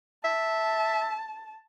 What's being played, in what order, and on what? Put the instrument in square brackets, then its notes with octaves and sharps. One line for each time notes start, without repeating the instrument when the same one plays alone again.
[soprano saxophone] E5 [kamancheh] A5